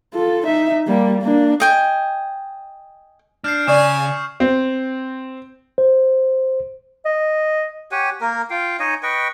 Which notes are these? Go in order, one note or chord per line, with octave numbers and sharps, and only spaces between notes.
F4 A4
D#4 E5
G3 A#3
A#3 D4
D#5 G5 G#5
D4 F6 G6 C7
C#3 D5 G#5 C#6 D#6 E7
C4
C5
D#5
G4 C#5 F#5 G#5
A#3 A#4
F4 F5 G5
D#4 C#5 D#5 G#5
B4 D#5 G5 C#6